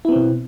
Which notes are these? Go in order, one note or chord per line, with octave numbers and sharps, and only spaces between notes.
B2 B3 C4 E4